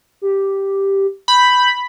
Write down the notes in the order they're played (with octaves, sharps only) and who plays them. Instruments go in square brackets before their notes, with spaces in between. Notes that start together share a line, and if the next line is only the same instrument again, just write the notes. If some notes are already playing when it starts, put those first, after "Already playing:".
[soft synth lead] G4
[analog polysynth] B5 [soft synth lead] G6